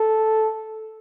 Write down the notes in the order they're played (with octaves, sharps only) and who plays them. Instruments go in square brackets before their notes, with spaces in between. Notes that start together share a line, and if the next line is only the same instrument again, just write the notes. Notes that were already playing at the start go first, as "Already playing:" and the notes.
Already playing: [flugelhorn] A4